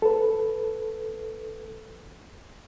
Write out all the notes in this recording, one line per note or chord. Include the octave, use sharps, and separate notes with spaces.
A4 B4